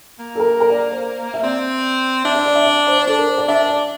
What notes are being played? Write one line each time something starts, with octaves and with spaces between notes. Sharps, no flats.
A#3
A4
A#4
A#4
D5
C5
E5
C4 D5
D4 E5
D5
D5
E5
D5
C5
C5
D4 A4
A#4
C5
D5
D4 E5
D5